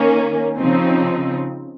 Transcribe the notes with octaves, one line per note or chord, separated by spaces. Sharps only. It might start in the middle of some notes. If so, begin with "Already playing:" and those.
Already playing: D#3 A#3 C#4
C#3 F3 C4 D#4